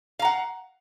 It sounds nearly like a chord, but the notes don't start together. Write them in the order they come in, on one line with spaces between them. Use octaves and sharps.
F5 A#5 F#5